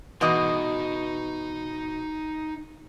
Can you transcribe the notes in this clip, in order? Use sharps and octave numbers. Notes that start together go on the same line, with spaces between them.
B2 E3 D#4 D#5 C6